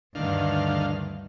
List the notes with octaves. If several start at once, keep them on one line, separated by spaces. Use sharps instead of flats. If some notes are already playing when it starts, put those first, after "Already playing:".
D2 G2 D3 D#3 F5